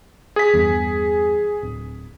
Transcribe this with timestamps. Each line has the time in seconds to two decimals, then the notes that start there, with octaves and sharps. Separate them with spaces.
0.36 G#4 B6
0.53 E2 G2
1.63 D1